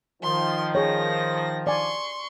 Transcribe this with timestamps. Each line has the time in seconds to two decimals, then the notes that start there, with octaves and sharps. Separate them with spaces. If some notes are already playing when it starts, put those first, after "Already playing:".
0.23 D#3 F3 C6
0.75 G#4 C#5 A#6
1.67 D5 G#5 C6 C#6